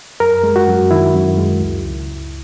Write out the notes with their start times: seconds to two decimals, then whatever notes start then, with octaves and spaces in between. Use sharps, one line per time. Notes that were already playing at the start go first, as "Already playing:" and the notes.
0.20 F#2 A#4
0.43 G#3
0.56 F#4
0.68 F#2
0.91 D#3 E4
1.14 F#2
1.38 G#3
1.61 C#2
1.85 C#2
2.09 C#2